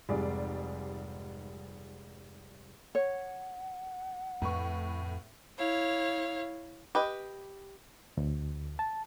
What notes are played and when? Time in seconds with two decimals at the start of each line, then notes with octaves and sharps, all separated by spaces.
0.09 F1 G#2 G3 G#3 G#4 D5
2.95 C#5 F#5
4.42 F2 A2 B4 C#6
5.56 E4 C#5 F5
6.95 G4 B4 D#5
8.17 D2
8.79 A5